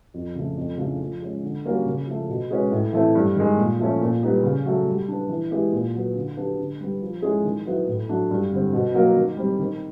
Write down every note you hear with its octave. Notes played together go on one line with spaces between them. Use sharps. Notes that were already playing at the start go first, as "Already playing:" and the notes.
F2
C#3 F3 A3
F2
C#3 F3 A3 D4
F3
G#3 C#4
D3
G3 A#3 C#4 F#4
C#3
F3 A3
B2
G#3 C#4 F#4 B4
A2
E3 A3 C4 E4
G2
D#3 G#3
A#2
F3 A3 C#4
A#2
G3 B3 D#4 G4
C#3
F#3 A3
G3
B3 D4
E3
G#3 B3 E4 G4
A#2
F#3 B3
D3
F#3 B3 D4 G4
D3
G3 B3
F3
G#3 C#4 E4 G#4
D#3
F#3 B3 E4
A2
F#3 A3 D4
G2
D3 G3 C4
B2
F#3 A#3
D#3
G3 C4
D#3